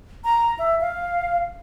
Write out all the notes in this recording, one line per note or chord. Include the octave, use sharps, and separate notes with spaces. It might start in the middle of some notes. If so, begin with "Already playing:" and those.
A#5
E5
F5